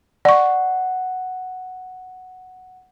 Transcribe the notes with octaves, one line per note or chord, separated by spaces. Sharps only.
D5 F#5 C#6